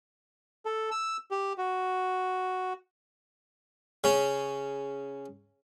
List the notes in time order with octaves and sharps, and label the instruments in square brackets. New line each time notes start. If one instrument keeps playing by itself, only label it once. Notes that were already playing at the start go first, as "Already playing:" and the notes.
[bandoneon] A4
E6
G4
F#4
[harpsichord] C#3 C#4